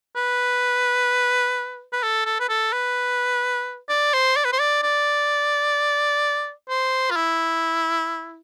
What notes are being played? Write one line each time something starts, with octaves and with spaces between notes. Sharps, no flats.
B4
B4
A4
A4
B4
A4
B4
D5
C5
D5
B4
C5
D5
D5
C5
F4
E4